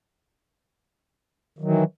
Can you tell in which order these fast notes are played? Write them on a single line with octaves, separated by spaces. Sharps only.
D#3 F#3 E3